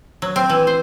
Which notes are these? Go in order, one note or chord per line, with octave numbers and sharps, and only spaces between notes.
F#3
C4
E3
C5